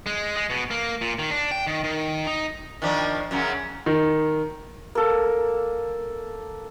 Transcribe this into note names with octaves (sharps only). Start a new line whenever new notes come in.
G#3
G#3
B2
A#3
A#2
D#3
D4
G5
D#3
D#3
D#4
D#3 F3 D4
F#2 C#3 F#3
D#3
A#3 A4